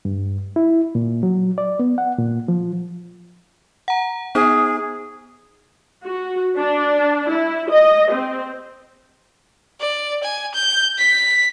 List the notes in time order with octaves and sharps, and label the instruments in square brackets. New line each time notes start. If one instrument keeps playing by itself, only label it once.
[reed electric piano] G2
E4
A#2
F#3
D5
B3
F#5
A#2
F3
[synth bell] F#5 A#5
[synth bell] B3 D#4 C5 [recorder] G#4
[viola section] F#4
D4
E4
D#5
C4
[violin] D5
G#5
G6
B6